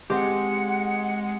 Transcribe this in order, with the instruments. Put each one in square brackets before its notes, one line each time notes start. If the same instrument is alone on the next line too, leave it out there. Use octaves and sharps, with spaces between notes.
[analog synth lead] G#3 [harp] C4 G4 [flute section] F#5